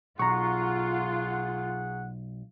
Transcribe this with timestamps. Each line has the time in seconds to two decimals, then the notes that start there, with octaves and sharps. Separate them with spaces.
0.19 B1 F4 G#4 F#5 A#5 C#6